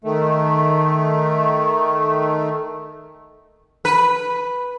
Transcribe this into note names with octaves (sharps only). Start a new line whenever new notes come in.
D#3 A3
B4